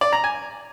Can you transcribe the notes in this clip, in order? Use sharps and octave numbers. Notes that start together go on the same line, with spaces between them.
D5
A#5
G#5